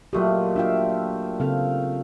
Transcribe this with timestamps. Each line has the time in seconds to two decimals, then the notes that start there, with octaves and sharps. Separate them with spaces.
0.13 A#2 F#3 A3 F#4 G4 D#5
0.56 D4 F4 E5 F5 G5
1.40 C#3 C4 A4 F5